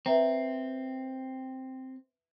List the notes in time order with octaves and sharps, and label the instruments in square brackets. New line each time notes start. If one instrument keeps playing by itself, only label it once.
[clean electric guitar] C4 [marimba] B4 E5 A#5